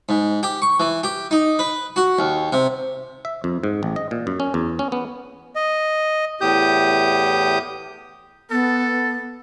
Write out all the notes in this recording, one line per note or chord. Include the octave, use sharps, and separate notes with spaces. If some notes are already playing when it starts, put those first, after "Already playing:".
G#2
G4
C#6
E3
G4
D#4
B4
F#4
D#2
C3
E5
F2
G#2
A1
D#5
A#2
F#2
C#4
E2
C#4
B3
D#5
E2 A2 G4 D#6 G6
B3 A4